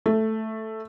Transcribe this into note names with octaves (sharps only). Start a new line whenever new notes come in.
A3